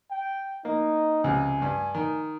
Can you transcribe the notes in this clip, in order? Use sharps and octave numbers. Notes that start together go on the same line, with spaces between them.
G5
A#3 D#4
C#2 C3 G#5
G2
D#3